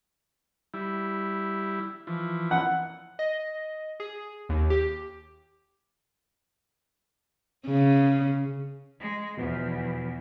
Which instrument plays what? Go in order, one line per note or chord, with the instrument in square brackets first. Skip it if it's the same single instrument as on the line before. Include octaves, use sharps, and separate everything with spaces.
[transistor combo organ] G3 E4
E3 F3
[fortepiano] F#5
[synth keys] D#5
G#4
D#2
G4
[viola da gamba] C#3
[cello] G#3
[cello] E2 [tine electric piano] B2 F3 B3